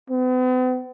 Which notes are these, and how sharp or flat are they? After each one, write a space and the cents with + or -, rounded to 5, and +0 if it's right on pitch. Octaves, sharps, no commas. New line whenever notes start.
B3 +45